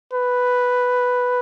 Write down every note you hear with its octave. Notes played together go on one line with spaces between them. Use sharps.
B4